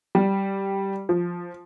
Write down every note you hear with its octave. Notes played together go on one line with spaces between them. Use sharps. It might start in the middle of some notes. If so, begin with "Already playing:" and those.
G3
F3